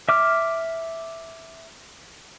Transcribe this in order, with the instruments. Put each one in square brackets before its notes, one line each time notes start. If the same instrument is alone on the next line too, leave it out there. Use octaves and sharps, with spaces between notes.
[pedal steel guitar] E5 D6 F6